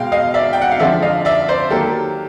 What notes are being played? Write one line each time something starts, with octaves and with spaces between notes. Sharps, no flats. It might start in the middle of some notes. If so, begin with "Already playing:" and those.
Already playing: B2 G#3 F5 G5
D#5 F5
D5 E5
G5
F#5
F5
D3 F3 G#3 D5 E5
D#5 F5
D5 E5
C5 D5
D#3 F#3 A#3 G4 A4